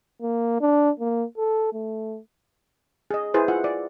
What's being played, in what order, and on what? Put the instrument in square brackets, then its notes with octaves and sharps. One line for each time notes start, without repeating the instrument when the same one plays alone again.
[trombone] A#3
D4
A#3
A4
A3
[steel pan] G#4 D#5
E4 G#4 B4 C5
F4 E5 F#5
D5